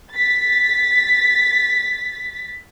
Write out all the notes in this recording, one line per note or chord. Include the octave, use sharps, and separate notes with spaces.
A6 B6